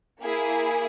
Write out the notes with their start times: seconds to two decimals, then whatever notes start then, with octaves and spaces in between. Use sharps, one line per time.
0.21 A#3 E4 G#4